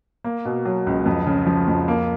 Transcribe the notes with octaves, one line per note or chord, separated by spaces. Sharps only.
A#3
B2
F#3
C#2
F2
C#3
F3
F2
A#3